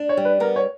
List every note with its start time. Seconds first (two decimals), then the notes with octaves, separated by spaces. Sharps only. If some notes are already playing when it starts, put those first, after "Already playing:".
Already playing: D4
0.09 C#5
0.17 G3
0.25 B4
0.40 B3 A#4
0.56 C#5